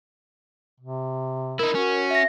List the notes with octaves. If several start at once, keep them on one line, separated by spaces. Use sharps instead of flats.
C3
D#4 E4 A#4
C#4 F#4
E5 A#6